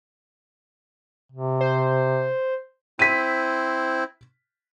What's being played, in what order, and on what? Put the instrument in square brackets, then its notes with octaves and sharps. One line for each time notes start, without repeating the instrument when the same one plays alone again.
[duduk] C3
[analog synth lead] C5
[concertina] C4 E4 C5 [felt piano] B6 D#7